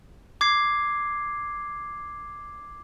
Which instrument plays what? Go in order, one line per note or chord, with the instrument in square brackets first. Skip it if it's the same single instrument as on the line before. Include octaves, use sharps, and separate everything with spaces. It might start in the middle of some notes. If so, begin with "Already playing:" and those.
[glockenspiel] D6 G#6 C7